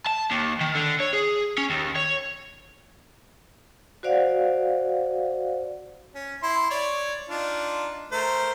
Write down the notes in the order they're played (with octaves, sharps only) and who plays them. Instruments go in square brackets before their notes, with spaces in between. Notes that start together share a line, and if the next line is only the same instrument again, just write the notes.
[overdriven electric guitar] A5
D#2
D#3
D3
C#5
G#4
C#4
D#2
C#5
[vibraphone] F#4 C5 D5 F5 F#5
[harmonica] C#4
E4 C6
C#5 D5
D4 D#4 F4
A3 A#4 C5